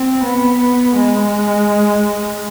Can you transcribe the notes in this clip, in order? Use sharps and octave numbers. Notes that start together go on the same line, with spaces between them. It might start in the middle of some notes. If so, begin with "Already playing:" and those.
Already playing: C4
B3
G#3